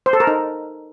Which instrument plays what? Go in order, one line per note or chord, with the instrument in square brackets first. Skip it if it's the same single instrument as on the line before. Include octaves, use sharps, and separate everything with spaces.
[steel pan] C5
A4
A#4
D#4